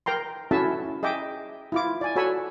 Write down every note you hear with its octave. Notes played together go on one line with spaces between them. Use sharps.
A#4 G5 A#5 C6
C#4 E4 F#4 A4 E5 A5
G#4 D#5 E5 G5 D6
E4 F4 D6
D5 G#5
F#4 A4 C#5 G#5 B5 E6